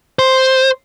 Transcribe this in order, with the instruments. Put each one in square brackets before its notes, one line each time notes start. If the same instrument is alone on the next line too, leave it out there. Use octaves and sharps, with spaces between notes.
[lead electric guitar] C5